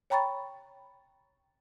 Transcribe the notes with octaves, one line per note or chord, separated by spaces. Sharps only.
C#5 G5 A#5 B5 C#6 A6